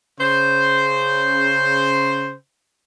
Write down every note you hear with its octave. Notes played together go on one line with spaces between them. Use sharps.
C#3 C5